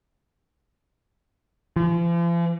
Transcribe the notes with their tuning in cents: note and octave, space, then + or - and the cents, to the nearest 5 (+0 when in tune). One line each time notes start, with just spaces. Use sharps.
F3 -45